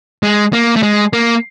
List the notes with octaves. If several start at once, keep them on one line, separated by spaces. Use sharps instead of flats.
G#3
A#3
A3
G#3
A#3